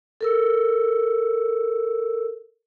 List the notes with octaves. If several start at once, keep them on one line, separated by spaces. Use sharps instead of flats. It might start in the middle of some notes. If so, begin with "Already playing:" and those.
A4 A#4 E6